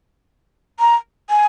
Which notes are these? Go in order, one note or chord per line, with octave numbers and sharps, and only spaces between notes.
A#5
G#5